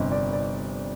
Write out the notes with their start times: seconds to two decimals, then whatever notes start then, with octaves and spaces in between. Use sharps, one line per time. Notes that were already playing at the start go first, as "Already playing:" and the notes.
Already playing: G1 F2 C3 D#5
0.12 D5
0.33 D5